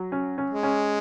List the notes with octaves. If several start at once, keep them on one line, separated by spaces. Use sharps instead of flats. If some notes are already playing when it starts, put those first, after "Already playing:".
Already playing: F#3
C#4
C#4
G#3
C#4